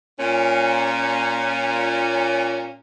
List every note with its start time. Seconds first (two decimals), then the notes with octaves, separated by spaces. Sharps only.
0.20 A#2 C#4